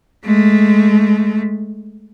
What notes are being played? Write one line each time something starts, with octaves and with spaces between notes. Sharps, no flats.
G#3 A3